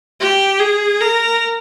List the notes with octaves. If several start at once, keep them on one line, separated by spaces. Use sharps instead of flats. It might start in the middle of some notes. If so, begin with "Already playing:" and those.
G4
G#4
A#4